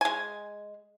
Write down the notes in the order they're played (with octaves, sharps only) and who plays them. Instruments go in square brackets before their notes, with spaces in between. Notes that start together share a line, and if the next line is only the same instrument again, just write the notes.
[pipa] G#3 G#5